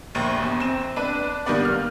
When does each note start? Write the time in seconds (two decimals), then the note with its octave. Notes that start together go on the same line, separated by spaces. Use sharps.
0.15 A#1 D#2
0.42 E2
0.60 C4 E7
0.96 D4 B4
1.46 D#3 G3 A#3 B3 D5
1.65 F6